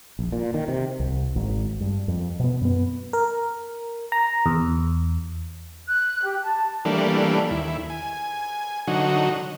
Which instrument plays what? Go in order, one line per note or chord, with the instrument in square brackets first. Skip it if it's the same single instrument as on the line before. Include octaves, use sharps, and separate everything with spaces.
[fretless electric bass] A#1
A#2
D#3
C3
[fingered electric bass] C2
G#1
G2
F2
B2 B3
F#2 B3
[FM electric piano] A#4
A#5
E2
[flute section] F#6
G4
A5
[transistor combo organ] E3 G3 A3 A#3 D4
D#2 E4
G#5
D3 F#3 D#4 F#4